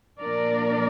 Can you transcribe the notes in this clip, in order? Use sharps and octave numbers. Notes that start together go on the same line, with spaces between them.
A#2 F3 A#3 D4 A#4 D5